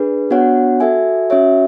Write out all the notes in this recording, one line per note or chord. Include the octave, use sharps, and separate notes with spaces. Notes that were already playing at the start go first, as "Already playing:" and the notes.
Already playing: D4 G#4 B4
B3 D4 F#4 C#5 F#5
F#4 A4 E5 G#5
C#4 F#4 C#5 E5